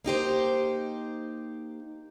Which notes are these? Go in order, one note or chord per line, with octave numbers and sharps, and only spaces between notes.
A#3 D#4 G4 C5